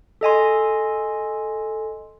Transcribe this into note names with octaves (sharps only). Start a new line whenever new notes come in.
A4 D#5 G#5 C6